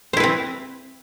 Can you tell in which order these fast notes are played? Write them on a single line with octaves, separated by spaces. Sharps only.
C5 E4 B4 C4